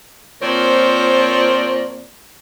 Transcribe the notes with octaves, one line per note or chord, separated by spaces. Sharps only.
A#2 F3 C4 A#4 C#5 D5